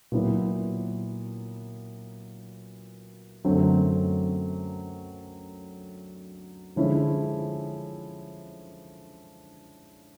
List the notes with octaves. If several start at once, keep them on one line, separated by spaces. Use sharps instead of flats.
A#2 F#3 B3 E4
F#2 D3 F#3 A3 C4
D3 F3 G#3 C#4 E4